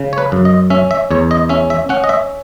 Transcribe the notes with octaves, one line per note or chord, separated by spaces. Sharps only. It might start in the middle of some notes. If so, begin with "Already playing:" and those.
Already playing: C#3
C#5
B4
F#2
D#5
C#4 E5
E5
E2 C#5
D#5
C#4 E5
E5
C#4 F#5
D#5
E5